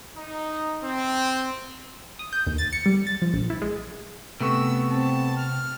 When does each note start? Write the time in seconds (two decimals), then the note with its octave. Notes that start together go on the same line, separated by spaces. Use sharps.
0.16 D#4
0.83 C4
2.19 D#6
2.33 G6
2.47 D#2
2.58 A6
2.73 C#7
2.86 G3
3.07 A6
3.22 F3
3.34 A#1
3.50 E4
3.62 G#3
4.41 C3 A3 B3 C#6 E6
4.91 C4 A5
5.37 F6